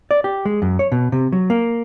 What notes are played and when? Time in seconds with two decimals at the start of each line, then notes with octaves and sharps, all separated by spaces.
0.11 D5
0.24 G4
0.45 G#3
0.62 F#2
0.79 C#5
0.92 B2
1.12 C3
1.32 F#3
1.50 A#3